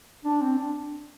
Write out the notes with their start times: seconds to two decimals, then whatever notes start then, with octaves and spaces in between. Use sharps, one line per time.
0.25 D4
0.41 C4
0.57 D4